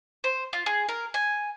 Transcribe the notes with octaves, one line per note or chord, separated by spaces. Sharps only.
C5
F4
G#4
A#4
G#5